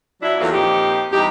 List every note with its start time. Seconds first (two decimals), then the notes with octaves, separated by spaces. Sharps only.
0.22 F#3 D4 E4
0.40 E2 E3 F#3 A#3 F4 A4
0.52 F2 A#2 F3 D#4 G4
1.11 E2 G3 D#4 G4